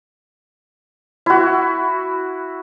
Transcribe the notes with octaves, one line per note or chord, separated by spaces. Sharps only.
E4 F#4